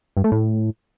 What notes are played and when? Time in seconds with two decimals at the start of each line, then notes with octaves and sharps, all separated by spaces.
0.17 G2
0.24 A3
0.32 A2